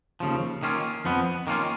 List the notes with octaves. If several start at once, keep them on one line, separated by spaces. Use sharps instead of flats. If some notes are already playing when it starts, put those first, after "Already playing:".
D#2 C#3 F3
D#3 A#3 C#4 F4
F2 F3 B3
D#3 A#3 C#4 F4